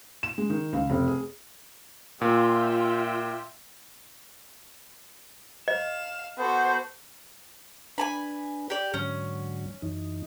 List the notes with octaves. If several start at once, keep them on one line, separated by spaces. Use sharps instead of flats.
E7
G#3
D#3
C#2
F1
G#4
A#2 F4 E5 G5
D#5 F5 E7
B3 F#4 A4 C5
D4 B4 G#5 A5 B5
G4 D5
G#2 D3 F#3 C#4
F#2 E3 D#4